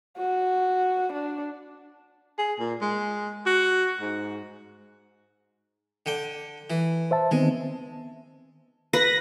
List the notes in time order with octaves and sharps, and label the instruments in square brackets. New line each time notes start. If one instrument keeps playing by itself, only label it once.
[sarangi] F#4
D4
[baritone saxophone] G#4
A#2
G#3
F#4
G#2
[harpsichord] D3 G5
E3
[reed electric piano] C5 E5 A5
[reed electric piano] D#3 B3 C4 [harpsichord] G#3
[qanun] B4 [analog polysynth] A#6